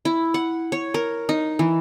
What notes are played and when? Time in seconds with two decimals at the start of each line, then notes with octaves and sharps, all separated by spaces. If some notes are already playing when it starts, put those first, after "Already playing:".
0.05 E4
0.34 F#5
0.72 C#5
0.94 A#4
1.29 D#4
1.59 E3